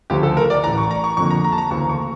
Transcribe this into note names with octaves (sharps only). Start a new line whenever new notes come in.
D2 C#3 F3 G4
A4
A#4
D5
A1 A2 E3 A#5
C#6
A#5
C#6
F2 D3 F3 A#3 C#6
A#5
A#5
A5
A#5
D2 C#3 E3 A#3 C#6
C#6